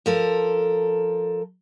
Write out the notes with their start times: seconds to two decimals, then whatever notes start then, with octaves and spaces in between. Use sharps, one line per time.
0.06 F3 A4 A#4